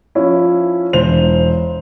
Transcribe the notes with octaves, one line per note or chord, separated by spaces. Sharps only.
F3 C#4 E4
E1 C5 F7